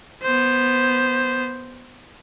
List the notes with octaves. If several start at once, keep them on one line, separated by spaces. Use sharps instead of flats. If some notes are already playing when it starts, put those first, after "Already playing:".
B3 C5